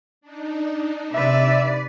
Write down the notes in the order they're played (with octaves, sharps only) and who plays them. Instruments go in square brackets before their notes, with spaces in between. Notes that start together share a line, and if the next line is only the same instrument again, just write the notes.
[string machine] D4 D#4
[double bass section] C3 [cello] B4 D5 [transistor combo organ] E5